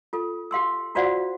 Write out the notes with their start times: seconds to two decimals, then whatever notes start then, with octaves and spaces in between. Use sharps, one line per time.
0.13 F4 A4
0.51 G4 F5 C6 E6
0.95 F4 F#4 C5 D5 F5 F#5